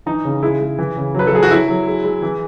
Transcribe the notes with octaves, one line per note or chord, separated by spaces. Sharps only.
E3 D#4
C#3
G#3 E4
G#3
E3
C#3
F#3 B4
A4
F#3 G#4
F#4
F#3 E4
F#3
G#3
G#3
E3